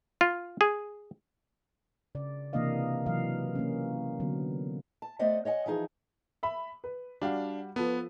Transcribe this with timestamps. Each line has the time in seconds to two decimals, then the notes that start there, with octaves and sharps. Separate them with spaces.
0.21 F4
0.61 G#4
2.15 C#3 D5
2.53 C3 E3 A#3 D4 D#5 F5
3.06 C3 E3 F#3 F5
3.55 A#3 C#4
4.20 D3 F#3 B3
5.02 A5
5.19 A3 B3 C5 D5 D#5 F#5
5.45 C#5 D#5 F#5 G#5
5.66 E3 F3 D#4 G#4
6.43 E5 B5
6.84 B4
7.22 G3 D4 F#4 F5
7.76 F3 B3 A4 B4